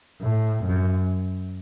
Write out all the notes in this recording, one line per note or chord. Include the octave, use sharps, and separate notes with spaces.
A2
F#2